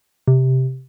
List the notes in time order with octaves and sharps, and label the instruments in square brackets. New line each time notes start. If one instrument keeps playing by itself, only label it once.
[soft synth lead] C3